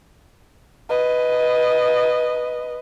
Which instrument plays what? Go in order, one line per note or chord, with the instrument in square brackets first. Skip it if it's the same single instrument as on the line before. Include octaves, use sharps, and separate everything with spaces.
[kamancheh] B4 D#5